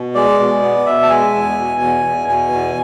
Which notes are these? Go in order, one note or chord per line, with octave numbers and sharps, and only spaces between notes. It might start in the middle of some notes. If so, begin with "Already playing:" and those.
Already playing: B2
G#3 D5
B2
B3
B2 E5
A5
G#3 G#5
E2
B2
E2
E2
B2 G#5
E2